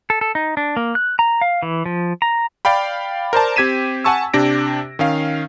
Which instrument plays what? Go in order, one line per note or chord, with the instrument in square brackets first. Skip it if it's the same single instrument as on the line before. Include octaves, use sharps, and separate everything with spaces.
[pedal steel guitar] A4
A4
D#4
D4
A#3
F#6
A#5
F5
E3
F3
A#5
[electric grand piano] D5 F5 G5 B5
A#4 C5 D5 A5
C4 G4 G#6 B6 D#7 E7
F#5 G#5 A5 C#6 E6
C3 D4 G4 A#6 D7
D#3 C#4 F5